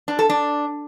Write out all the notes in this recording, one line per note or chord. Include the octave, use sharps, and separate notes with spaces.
D4
A4
D4